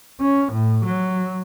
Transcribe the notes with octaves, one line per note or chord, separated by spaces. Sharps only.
C#4
A2
F#3